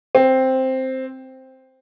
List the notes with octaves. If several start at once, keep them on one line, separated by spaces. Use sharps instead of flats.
C4